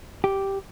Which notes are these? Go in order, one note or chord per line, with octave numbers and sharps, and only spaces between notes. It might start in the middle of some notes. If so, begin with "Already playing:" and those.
G4